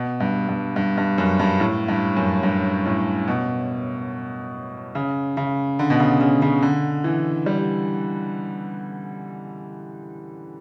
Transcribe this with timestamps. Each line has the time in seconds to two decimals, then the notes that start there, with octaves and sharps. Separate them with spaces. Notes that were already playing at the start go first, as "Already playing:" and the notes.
Already playing: B2
0.20 G2
0.48 G2
0.76 G2
0.97 G2
1.18 F#2
1.39 G2
1.60 A2
1.88 G2
2.16 F#2
2.43 G2
2.86 A2
3.27 B2
4.95 C#3
5.37 C#3
5.79 D3
5.90 B2
6.00 C#3
6.21 C#3
6.42 C#3
6.62 D3
7.04 E3
7.46 G3